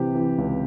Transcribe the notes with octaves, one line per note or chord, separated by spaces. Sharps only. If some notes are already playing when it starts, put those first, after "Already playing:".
Already playing: C3 E3 G4
E3
C#2